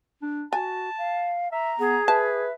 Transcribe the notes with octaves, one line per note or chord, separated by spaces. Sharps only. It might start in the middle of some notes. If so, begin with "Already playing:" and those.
D4
F#4 G#5 A5
F5
E5 A#5
B3 G#4
B4 E5 A5